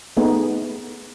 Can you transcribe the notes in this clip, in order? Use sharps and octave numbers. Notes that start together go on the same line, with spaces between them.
A3 B3 D#4 G#4